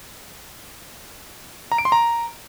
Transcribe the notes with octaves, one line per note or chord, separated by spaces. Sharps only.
A#5
D7
C6
A#5